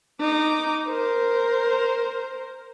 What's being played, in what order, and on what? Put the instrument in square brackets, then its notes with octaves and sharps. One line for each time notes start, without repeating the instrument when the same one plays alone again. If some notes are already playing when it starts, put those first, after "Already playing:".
[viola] D#4 D6
A#4 C5